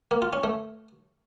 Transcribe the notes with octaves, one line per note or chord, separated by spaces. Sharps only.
A#3
F4
C#4
A3